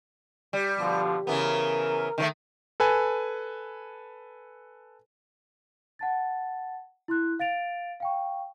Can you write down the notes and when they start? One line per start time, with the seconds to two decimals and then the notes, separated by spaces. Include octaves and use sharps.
0.53 G3
0.78 B2 D3 F3
1.27 C#3 E3 B3 A#4
2.18 D#3 E3 A3
2.80 A4 B4 G#5
5.99 F#5 A5 A6
7.08 E4 C6 F#6
7.40 F5 A6 D7 F7
8.00 F5 G5 C#6